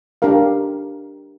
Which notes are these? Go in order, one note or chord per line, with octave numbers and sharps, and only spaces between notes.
D4 G4 A#4 F5